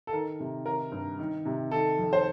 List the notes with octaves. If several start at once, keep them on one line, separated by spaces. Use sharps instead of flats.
A4
D#3 A#4
C3
D#3 A#4
G2
D#3
C3
D#3 A4
F2
C5